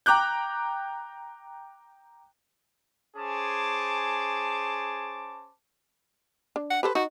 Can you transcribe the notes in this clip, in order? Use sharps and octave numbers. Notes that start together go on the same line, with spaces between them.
G5 A#5 D6 F#6 G6
C#4 G#4 C5 A5 D6
D4
F#5
G4 A4 B4 C5
D#4 F#4